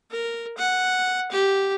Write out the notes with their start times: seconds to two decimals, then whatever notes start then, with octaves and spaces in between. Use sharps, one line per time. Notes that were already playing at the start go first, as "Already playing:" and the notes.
0.11 A#4
0.58 F#5
1.32 G4